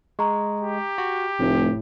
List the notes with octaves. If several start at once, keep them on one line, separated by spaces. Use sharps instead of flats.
G#3 A#5 C#6
G4
F#4
F1 A2